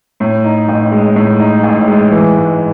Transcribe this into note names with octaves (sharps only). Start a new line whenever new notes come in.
A2
D#4
A1
G#3
A2
D#4
A1
G#3
E3
G#2